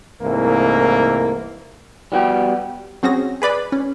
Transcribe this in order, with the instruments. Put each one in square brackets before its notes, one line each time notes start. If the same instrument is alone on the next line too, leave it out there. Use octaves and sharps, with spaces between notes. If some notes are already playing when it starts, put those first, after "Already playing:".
[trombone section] C2 G#2 E3 A3 A#3
[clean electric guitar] G3 B3 F#4 G5
[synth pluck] F#3 C4 C#4 F#4 G#4 A#6
G#4 B4 D5 B5
C#4